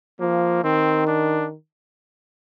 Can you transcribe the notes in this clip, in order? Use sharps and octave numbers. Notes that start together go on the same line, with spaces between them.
F3 A#3
D#3 C4
D4